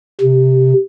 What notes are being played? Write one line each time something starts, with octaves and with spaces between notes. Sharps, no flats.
C3